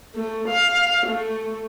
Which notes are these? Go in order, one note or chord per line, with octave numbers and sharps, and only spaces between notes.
A3
F5
A3